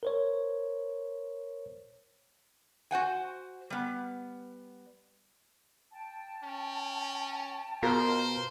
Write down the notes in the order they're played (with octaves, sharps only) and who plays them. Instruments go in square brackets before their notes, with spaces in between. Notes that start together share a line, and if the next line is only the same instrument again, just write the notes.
[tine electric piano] A#4 C5 C#5
[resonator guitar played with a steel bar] F#4 C5 F#5 G#5
G3 B3
[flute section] G5 A5
[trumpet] C#4
[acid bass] B2 [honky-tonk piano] F4 A#4 A#5 [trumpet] C5